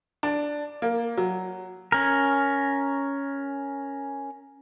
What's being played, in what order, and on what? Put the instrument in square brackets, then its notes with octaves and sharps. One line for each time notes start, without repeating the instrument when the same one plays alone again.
[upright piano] D4
A#3
F#3
[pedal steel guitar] C#4 A#4